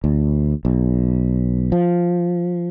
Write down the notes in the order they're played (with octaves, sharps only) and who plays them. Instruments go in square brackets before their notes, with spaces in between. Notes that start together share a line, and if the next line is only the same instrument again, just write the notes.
[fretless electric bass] D2
B1
F3